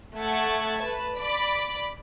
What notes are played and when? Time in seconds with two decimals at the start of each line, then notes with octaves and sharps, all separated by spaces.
0.18 A3 E5 F#5 C#6 G#6 A6
0.80 B4 A5
1.18 D5 B5 D6 B6